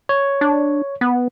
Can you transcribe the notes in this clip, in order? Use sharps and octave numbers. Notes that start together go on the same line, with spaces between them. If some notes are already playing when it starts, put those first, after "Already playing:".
C#5
D4
B3